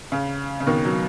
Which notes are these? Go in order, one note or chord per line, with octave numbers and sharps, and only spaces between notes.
C#3
C#3
B2 D#3
F#3